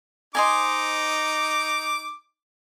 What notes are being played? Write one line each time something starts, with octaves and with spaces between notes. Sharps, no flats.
D#4 C5 D#5 G#5 D6